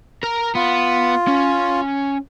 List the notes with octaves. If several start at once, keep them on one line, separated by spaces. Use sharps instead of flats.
A#4 A#5
B3 F4
C#4